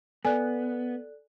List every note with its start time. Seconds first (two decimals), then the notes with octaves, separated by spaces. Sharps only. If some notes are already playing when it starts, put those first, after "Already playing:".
0.25 B3 A4 D5 G#5 F#6